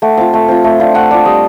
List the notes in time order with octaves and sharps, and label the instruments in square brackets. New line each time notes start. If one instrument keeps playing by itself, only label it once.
[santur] A3 F#5
C4 F4 F5
A3
C4 F4
A3
D4 F4
A3 F#5
D4 F4 D5
G3 D#5